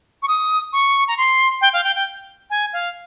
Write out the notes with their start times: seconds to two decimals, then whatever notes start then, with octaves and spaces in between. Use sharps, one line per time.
0.23 C#6
0.28 D#6
0.73 C#6
1.08 A#5
1.17 C6
1.61 G5
1.73 F5
1.84 G5
1.96 G5
2.50 G#5
2.73 F5